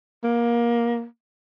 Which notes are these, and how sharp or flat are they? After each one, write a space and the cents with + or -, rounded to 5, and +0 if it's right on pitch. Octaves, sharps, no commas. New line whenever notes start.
A#3 +20